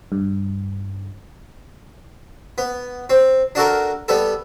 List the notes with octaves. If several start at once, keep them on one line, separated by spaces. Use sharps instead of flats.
G2
B3
C4
D4 F#4 A4 A#4
G3 B3 A4